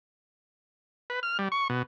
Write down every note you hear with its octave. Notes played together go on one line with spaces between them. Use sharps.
B4
F6
G3
C#6
B2